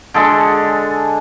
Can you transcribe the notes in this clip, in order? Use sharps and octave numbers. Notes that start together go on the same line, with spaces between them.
D3 G#3 A4